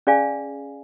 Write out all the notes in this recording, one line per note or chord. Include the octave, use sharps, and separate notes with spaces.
C#4 G#4 D5 F5 G#5